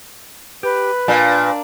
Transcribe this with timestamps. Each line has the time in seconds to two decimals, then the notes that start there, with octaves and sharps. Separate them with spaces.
0.63 G4 B4
1.08 A#2 D4 F5